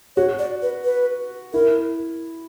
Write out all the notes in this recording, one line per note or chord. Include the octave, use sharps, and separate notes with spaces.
F#4 C#5
D5
B4
B4
E4 A#4